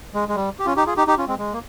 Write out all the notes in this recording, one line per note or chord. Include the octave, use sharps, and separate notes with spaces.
G#3
G#3
G3
G4
C#4 F4
D#4 G4
F4 G#4
D#4 G4
D#4 G4
C#4 F4
G#3 C4
G#3
A#3